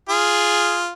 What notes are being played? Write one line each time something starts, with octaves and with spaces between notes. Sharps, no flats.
F4 G#4